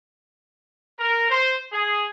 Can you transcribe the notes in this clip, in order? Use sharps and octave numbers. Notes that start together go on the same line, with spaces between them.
A#4
C5
G#4